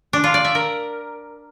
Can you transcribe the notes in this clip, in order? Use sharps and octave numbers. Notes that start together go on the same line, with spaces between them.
D4
F4
D5
E5
A#4